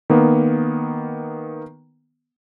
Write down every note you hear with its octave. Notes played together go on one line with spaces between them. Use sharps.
D#3 A#3 B3